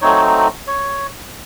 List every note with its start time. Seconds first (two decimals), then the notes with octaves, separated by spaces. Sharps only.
0.01 F#3 A3 C4 D#4 C#5
0.67 C#5